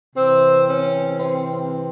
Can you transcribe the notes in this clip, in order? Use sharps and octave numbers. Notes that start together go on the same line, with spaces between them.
C3 E3 C4
C#4
C4